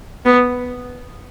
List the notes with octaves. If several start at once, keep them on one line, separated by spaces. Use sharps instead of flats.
B3